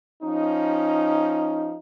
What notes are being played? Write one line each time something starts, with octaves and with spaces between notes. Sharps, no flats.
F3 C#4 D#4